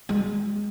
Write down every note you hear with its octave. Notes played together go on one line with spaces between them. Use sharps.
G#3